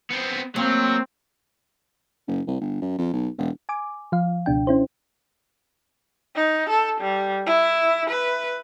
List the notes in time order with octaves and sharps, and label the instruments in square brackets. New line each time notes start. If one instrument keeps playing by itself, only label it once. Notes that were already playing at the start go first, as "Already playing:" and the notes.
[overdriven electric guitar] B3 C4
[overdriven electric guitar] F#3 [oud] A#3 F5 [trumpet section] C4
[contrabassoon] F#1
C2
G1
F#2
F2
B1
E1
[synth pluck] G#5 D6
F3 F5
C#2 B2 D4 G5
C#4 E4 C5
[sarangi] D#4
A4
G3
E4
B4